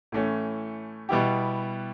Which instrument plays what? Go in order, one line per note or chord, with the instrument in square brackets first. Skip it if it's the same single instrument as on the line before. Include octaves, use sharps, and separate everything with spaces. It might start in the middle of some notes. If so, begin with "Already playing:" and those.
[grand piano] A2 E3 A3 C#4
B2 G3 B3 E4 G4